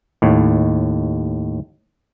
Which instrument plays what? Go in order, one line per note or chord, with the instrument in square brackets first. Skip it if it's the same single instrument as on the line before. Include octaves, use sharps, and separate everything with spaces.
[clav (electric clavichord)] D#2 A2